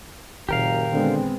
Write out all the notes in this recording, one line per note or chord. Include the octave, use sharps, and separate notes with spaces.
F#1 A#2 D#3 G4 A#4 F5
D3 G#3 B3 C4